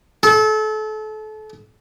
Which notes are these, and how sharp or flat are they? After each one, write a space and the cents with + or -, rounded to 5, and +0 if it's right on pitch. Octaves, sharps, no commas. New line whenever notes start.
A4 -30